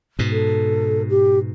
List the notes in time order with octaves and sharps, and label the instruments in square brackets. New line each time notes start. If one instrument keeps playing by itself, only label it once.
[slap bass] G#2 B2
[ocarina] A4
G4